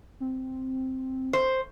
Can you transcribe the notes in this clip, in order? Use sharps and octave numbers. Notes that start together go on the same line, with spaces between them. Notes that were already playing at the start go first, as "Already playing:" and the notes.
C4
C5